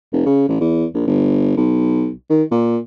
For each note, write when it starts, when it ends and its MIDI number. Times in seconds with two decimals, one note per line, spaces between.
0.13 0.22 29
0.26 0.48 49
0.48 0.58 33
0.60 0.85 40
0.94 1.03 34
1.07 1.57 31
1.57 2.11 35
2.30 2.43 51
2.51 2.78 46